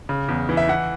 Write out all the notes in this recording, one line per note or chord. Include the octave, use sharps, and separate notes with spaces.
C#3
E2
E3
E5
E3 F#5